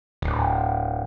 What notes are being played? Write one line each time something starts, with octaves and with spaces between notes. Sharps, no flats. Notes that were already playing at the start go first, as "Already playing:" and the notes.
D1